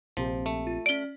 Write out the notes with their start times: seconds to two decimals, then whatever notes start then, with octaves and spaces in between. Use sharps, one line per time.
0.17 A#1 C3 F3
0.46 A3
0.67 F4
0.86 C#4 D5 D7 G7